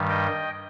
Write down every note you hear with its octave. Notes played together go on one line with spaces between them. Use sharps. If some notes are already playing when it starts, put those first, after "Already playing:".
Already playing: G2 D#3 G3
D#5 G5